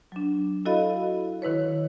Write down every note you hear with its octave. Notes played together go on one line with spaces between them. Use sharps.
F#3 D4
E4 F#4 A4 D#5 F5 B5
D#3 E4 B4 C#5